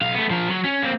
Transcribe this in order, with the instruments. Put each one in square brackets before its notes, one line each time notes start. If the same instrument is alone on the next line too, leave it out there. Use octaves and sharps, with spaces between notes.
[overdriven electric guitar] B1 F5
A3 B3
F3 A#4
F#3
C#4
A#3 C4